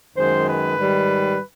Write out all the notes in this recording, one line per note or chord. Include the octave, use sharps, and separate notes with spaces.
F#2 D#3 G#3 C5
B4
G#2 D#3 G3